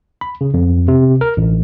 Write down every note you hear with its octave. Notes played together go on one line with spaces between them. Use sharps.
B5
C#3
F2
C3
A#4
A1